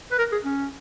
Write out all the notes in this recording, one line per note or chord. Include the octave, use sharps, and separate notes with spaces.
B4
A#4
G#4
C#4